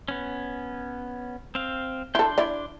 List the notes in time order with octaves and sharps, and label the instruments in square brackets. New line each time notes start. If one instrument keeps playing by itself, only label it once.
[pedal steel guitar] B3 C#4
C4 F5
[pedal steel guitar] D4 C6 G6 [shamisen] E4 A4
[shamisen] E4 D5